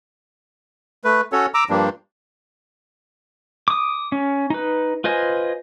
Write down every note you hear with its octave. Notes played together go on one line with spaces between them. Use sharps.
A3 B4
C#4 F#4 A4 C#5
A#5 D6 E6
G2 F3 G3 A#3 D4
D6 D#6
C#4
D#4 B4
F4 B4 C5 D#5 G#5